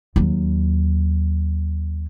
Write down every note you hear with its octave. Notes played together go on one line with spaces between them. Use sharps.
D#2 F#3